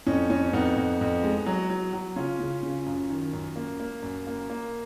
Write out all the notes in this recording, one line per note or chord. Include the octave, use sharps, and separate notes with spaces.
F2 C#4
F2 C#4
F2 B3 D#4
F2
F2
G#3
F#3
F#3
F#3
C#3 C#4 F4
C#3
C#3
F#2
D#3
F#2
A#3
A#3
F#2
A#3
A#3